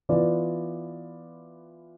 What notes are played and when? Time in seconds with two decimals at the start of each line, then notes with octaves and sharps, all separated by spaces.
0.09 E3 B3 F4 B4 D5